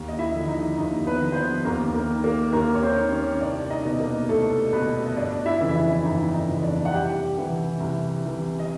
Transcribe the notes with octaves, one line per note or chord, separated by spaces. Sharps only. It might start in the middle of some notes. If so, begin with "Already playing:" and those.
Already playing: D#2
D#5
E4 E5
D3 F3
D#4 D#5
D#2 D#4 D#5
B3 B4
D3 F3
C5
B3 B4
D#2 A#3 A#4
A#3 A#4
D#3
A#3 A#4
D#2 A#3 A#4
C#5
C4 C5
D#3
C#4 C#5
C2 D4 D5
D#4 D#5
B2
A#3 A#4
C2 A3 A4
B2 B3 B4
D#5
G1 D4 D5
E4 E5
F2 C#3 E3
E4 E5
G1 D#4 D#5
D#4 D#5
F2 C#3 E3
D4 D5
F#5
C2 G4 G5
C3 E3
C2
C3 E3
D#5